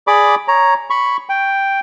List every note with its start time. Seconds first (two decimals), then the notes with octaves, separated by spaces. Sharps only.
0.07 G#4 D5 B5 D6
0.48 C#5 A#5
0.90 B5 C#6
1.29 G5